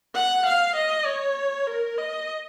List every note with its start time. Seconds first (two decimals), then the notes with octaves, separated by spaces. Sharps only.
0.14 F#5
0.46 F5
0.76 D#5
1.06 C#5
1.67 A#4
1.97 D#5